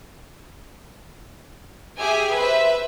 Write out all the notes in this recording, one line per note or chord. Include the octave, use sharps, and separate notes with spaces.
G4 G#4 E5 G#5
B4 C5 E5